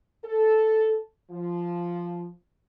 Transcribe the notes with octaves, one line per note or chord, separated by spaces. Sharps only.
A4
F3